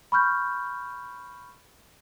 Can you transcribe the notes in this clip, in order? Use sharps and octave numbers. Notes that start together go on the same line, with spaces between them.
B5 C#6 F6 G6